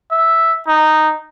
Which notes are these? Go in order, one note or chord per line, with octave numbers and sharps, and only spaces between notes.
E5
D#4